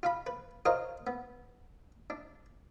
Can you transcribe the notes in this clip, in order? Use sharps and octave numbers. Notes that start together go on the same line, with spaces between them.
F4 F5 B5
B4
F4 A#4 C5 C#5 D#5 F5
B3
D4